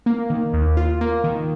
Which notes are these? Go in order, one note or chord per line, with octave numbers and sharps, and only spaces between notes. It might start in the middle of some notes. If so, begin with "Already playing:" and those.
A#3
D#3
D#2
F4
A#3
D#3